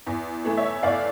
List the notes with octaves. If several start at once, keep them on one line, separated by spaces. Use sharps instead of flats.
E2
E3 A3
C#5 E5
E2 D5 F5